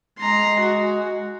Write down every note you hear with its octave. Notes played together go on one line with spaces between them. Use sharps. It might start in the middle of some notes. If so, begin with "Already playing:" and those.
G#3 A#5 C6
F#4